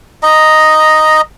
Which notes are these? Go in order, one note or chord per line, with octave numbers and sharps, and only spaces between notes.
D#5 A#5